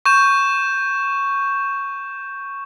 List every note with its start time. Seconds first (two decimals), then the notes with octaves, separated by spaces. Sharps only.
0.06 C#6 G6 E7